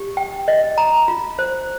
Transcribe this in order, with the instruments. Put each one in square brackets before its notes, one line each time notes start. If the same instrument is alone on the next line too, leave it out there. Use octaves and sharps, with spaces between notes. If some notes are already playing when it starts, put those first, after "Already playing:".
Already playing: [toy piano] G4
G5
D#5
A#5
F4
C5